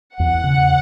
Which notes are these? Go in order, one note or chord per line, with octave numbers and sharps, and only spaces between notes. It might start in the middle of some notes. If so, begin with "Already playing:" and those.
E2 F#5
C#3